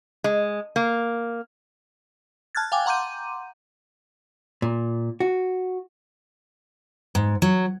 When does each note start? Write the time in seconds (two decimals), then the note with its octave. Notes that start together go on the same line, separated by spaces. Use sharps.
0.24 G#3
0.76 A#3
2.55 A5 F6 F#6 G#6 A6
2.72 F5 G5 G#5 D6
2.86 F#5 A#5 C6 D6 G6 D#7
4.62 A#2
5.20 F#4
7.15 G#2
7.42 F#3